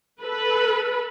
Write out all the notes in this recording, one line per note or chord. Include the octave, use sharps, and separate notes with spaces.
A4 B4